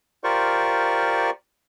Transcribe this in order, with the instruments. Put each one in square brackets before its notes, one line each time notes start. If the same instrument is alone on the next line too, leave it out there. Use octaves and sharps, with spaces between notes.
[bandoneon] F4 G4 A#4 C5 D5 C#6